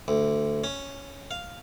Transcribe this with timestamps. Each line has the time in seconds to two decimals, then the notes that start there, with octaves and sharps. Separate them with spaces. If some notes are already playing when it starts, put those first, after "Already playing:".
0.08 D2
0.64 C#4
1.31 F5